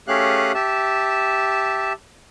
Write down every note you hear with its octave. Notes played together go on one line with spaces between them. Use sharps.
A3 C#4 G4 G#4 F5 F#6
G4 E5 A5